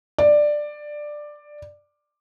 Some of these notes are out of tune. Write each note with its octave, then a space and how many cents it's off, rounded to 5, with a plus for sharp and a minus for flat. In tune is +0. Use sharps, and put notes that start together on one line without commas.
D5 +10